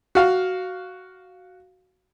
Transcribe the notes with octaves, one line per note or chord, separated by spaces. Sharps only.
F#4 F5